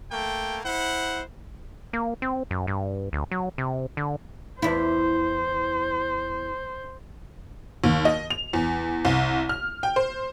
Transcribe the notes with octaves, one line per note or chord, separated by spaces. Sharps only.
A3 A#3 G5
E4 C5 F#5
A#3
C4
F#2
G2
D2
F#3
C3
D3
E2 E4 C5
D#2
D#5
F7
E2
C2
F6
G5
C5